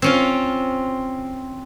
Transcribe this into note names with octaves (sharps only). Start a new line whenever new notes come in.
C4 C#4 F4